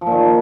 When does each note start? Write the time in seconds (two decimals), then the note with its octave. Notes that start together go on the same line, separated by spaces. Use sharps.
0.01 F3
0.06 A#2
0.12 D#3